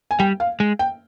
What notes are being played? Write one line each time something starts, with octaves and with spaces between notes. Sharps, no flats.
G#5
G3 G5
F5
G#3
G5